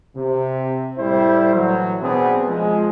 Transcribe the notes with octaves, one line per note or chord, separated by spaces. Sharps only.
C3
A2 G3 E4 C5
A2 E3 F#3
B2 B3 C4 D4 G#4
F3 G#3